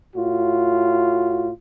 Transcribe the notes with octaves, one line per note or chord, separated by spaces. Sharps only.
A2 F4 F#4